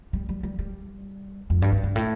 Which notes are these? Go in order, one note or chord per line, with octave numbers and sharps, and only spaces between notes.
G3
G3
G3
G3
F2
G2
G2
G2
A2